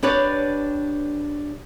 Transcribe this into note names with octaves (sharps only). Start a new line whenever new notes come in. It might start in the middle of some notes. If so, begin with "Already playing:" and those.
D4 G4 B4 C#5 D5